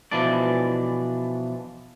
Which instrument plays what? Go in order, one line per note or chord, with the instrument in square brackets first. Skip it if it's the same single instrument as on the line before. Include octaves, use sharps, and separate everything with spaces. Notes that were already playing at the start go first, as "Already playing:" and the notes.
[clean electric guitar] B2 E3 F3 D4 D5